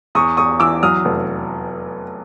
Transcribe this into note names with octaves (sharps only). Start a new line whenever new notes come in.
E2 C#6 D#6
E2 C#6 D#6
E3 D6 E6
F#3 D#6 F6
F1